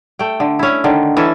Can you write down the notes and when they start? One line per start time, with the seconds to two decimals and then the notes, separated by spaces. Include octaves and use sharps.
0.19 A3 G5
0.40 D3
0.59 C#4 E4
0.84 D3 D#3
1.17 E3 C#4 A4